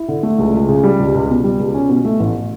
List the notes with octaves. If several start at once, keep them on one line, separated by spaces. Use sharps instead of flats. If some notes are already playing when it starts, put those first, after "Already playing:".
Already playing: E4
D3
A3
C#2
C#2
C#3
G3
C#2
C#2
B2
G3
C#2
C#4
B2
A3
A1